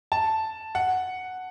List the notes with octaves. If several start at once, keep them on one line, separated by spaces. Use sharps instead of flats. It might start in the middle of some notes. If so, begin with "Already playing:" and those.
A5
F#5